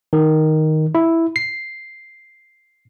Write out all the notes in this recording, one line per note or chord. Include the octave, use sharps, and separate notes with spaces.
D#3
E4
C7